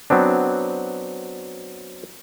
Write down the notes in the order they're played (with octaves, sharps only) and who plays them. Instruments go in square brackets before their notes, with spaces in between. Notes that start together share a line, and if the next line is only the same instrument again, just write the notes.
[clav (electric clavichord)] F#3 B3 C4 D4